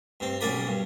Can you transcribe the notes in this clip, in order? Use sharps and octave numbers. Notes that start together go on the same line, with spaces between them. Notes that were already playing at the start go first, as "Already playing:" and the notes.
G2 C4
B1 A#3 C#4 A#4 D5 B5
G2